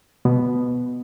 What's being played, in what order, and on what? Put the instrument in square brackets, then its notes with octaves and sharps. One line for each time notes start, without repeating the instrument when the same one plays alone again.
[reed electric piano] B2 B3